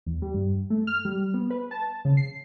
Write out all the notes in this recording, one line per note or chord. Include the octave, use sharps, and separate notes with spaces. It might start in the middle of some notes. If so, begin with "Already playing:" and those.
E2
G3
G2
A3
F6
G3
B3
B4
A5
C#3
C7